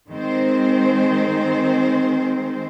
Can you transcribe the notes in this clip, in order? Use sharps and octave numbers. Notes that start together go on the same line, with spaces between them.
D#3 G#3 C4 C5